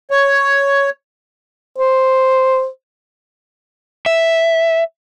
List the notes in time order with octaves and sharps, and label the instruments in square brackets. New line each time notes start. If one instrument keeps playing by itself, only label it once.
[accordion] C#5
[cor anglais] C5
[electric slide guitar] E5